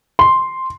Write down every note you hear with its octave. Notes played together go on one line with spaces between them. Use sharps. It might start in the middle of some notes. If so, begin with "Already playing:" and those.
C6